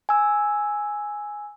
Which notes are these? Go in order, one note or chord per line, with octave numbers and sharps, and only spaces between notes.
G#5 E6